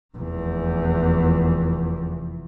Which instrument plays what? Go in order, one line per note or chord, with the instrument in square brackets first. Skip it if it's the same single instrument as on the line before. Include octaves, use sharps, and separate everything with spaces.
[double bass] F1 E2